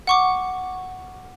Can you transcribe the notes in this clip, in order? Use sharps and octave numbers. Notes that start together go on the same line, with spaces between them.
F#5 C#6 D6